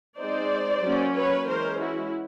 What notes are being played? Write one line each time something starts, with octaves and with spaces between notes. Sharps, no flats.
G#3 C4 D#4 C5 D5
F#3 A#3 C#4
B4 C#5
E3 G#3 C#4 A#4 C5
E4 F#4